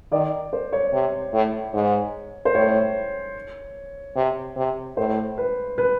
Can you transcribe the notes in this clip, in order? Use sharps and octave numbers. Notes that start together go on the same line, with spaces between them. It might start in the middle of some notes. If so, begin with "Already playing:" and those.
D#3 D5
C5
C#5
C3
A2
G#2
C5
A2 C#5
C3
C3
A2 C5
B4
B4